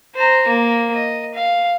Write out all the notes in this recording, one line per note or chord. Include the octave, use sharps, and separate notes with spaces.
C5 A#5
A#3
D#5
F5